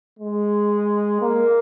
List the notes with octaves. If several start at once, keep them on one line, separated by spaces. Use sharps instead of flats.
G#3
A#3